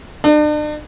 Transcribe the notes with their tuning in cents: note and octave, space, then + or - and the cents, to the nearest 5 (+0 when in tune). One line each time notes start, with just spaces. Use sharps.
D4 +40